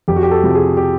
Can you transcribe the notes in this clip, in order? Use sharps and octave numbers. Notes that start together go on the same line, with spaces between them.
F2 G4
F#4
G4
A4
C3 F3
G#4
G4